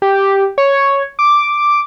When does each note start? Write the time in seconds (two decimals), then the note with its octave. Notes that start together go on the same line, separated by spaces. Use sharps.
0.02 G4
0.58 C#5
1.19 D6